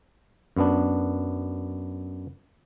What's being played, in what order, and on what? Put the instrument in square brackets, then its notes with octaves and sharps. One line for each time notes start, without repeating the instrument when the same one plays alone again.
[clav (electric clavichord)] F#2 B3 D4